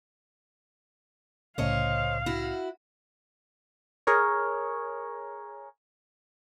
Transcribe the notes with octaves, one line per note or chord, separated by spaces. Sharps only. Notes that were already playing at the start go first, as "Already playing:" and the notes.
C2 A2 C#3 C5 C#5 D#5 F5
E4 F#4
G#4 A#4 C#5